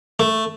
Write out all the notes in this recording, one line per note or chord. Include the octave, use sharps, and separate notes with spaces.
A3